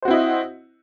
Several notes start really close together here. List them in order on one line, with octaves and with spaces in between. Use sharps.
C5 F#4 C4 E4 D#5